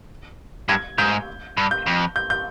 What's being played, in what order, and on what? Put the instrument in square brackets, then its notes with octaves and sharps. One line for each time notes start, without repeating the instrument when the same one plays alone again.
[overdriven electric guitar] G2 [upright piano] G#6
[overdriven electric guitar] G#2 [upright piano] G6
[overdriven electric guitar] G2
[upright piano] G6
[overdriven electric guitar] F2
[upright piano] G6
G6